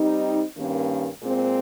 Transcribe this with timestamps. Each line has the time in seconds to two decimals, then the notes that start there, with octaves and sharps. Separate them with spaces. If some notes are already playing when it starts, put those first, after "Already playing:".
Already playing: G3 C4 D#4
0.57 G2 D#3 A#3 C#4
1.22 A#2 G#3 C4